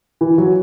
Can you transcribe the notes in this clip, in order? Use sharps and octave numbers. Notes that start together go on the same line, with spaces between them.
E3
F#3